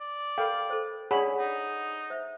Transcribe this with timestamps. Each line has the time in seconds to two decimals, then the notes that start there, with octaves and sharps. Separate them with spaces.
0.01 D5
0.38 A4 A#4 F5 G5 B5
0.70 A4 C5
1.11 D4 G#4 C#5 D5 F#5 B5
1.39 D#4
2.10 C5 E5